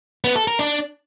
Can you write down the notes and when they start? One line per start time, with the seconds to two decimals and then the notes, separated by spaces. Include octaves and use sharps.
0.24 B3
0.36 A4
0.47 A#4
0.59 D4